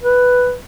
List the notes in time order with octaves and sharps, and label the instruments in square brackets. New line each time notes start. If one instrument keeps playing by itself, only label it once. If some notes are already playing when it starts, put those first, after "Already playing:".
[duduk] B4